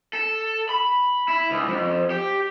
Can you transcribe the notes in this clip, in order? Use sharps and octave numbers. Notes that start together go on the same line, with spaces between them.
A4
B5
E4
C#2
F2
G4